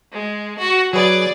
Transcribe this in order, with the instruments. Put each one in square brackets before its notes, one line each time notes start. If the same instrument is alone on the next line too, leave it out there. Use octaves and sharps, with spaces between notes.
[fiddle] G#3
F#4 F#5
[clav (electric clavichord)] F#3 B4 [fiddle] G#4 D5